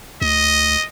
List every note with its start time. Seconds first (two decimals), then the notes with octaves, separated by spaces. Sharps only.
0.22 D2 D#5